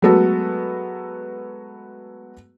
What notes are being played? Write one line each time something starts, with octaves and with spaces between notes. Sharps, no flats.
F#3 G#3 A3 B3 F#4 A4